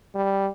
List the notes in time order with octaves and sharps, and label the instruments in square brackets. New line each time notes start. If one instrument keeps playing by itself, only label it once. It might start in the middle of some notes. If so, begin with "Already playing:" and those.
[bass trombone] G3